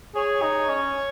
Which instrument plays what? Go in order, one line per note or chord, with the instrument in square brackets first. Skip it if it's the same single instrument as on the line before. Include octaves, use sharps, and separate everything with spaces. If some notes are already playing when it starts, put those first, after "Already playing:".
[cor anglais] G#4 [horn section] C#5
[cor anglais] D#4
C#4